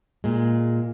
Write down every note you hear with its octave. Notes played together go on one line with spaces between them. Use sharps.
A#2 G#3